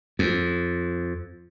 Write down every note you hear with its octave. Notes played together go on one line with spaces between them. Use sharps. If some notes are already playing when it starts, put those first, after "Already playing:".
F2